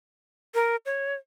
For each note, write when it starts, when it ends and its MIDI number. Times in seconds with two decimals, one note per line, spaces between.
0.54 0.76 70
0.86 1.14 73